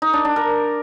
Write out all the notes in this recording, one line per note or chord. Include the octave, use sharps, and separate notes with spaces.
D#4
D4
D4
A#4